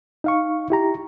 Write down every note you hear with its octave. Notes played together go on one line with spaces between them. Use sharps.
D#4 F5 C#6
E4 G4 A#5